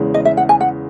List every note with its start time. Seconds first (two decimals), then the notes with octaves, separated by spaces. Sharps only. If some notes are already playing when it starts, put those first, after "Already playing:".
Already playing: E2 C#3 G#3
0.14 D#5
0.25 E5
0.37 F#5
0.49 G#5
0.61 F#5